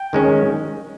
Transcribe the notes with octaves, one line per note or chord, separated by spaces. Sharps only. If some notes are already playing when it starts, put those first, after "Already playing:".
Already playing: G5
D#3 G#3 C#4